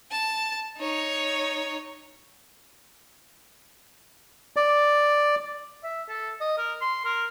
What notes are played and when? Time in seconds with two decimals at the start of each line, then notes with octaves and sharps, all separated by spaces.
0.11 A5
0.78 D#4 C#5
4.56 D5
5.84 E5
6.09 A4
6.41 D#5
6.58 A#4
6.82 C6
7.05 A#4